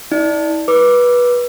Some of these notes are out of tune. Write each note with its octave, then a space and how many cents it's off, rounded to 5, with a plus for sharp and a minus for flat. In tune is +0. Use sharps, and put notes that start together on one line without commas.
E4 -40 D5 +0
B4 -20 D6 +0